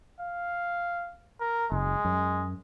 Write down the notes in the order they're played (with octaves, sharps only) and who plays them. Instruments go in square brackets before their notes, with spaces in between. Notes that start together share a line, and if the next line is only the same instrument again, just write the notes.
[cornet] F5
A#4
[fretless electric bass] F#1 [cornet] G#3
[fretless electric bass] F#2